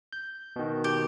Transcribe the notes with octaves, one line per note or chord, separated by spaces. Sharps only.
G6
B2 D#3
G4